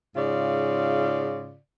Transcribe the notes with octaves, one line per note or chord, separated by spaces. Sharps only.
G#2 C#3 F4 D5